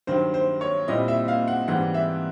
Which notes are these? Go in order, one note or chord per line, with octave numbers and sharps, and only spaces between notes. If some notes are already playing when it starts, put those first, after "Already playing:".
G2 D#3 F#3 C5
C5
C#5
A#2 G3 C4 E4 D#5
E5
F5
F#5
G#2 E3 G3 C4 F#5
E5